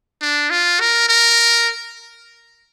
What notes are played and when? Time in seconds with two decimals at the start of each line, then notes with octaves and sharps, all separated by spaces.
0.22 D4
0.50 F4
0.80 A#4
1.09 A#4